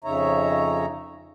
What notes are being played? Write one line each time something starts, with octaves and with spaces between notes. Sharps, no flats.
F2 C#3 D#4 C#5 E5 A#5